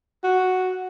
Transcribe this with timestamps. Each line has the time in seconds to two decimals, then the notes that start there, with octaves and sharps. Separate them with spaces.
0.24 F#4